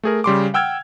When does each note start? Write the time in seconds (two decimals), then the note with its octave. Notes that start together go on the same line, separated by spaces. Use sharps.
0.03 A3 G#4 A#4
0.24 C#3 G3 C6 D6
0.54 F#5 G5 E6 F6 G#6